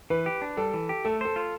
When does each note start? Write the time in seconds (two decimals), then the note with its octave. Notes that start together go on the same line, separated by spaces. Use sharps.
0.10 E3 B4
0.26 G4
0.42 D4
0.57 G3 A4
0.74 E3
0.89 G4
1.05 A3 A4
1.21 A4 C5
1.36 F4